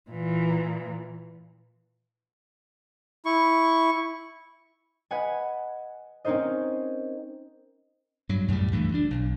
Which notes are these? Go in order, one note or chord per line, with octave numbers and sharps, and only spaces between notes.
A#2 E3
E4 C#6
B4 D#5 F#5 G#5
C4 C#4 D#4 A#4 C5 D#5
G2 F#3
F#2 A2 C#3 G3
C#2 G2 E3 A3
D2 D4
B1